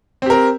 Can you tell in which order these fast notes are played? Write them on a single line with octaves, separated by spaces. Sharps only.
C4 G4 A#4